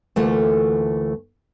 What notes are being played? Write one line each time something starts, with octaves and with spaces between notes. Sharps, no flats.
D2 E3 A3 A#3 F4 A4